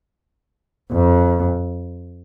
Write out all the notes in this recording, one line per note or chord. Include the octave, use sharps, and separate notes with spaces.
F2